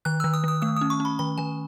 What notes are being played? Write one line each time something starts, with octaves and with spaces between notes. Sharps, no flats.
D#3 F#6
D#3 E6
D#6
D#3 D#6
A3 D#6
C#4 D#6
C#6
C#4
B5
D#3 B5
D#3 G#5